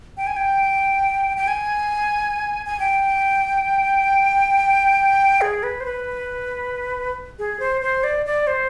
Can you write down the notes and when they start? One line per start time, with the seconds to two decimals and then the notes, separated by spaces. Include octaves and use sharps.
0.17 G5
0.27 G#5
0.36 G5
1.37 G5
1.48 G#5
2.66 G#5
2.80 G5
5.41 G#4
5.63 B4
5.80 C5
5.86 B4
7.39 G#4
7.60 C5
7.82 C5
8.04 D5
8.26 D5
8.47 C5